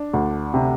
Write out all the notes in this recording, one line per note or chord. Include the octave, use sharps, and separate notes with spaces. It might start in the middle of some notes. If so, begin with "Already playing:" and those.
Already playing: D4
D2
C3